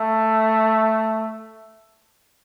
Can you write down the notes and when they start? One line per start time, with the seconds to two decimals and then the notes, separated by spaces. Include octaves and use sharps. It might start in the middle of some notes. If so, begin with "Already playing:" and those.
Already playing: A3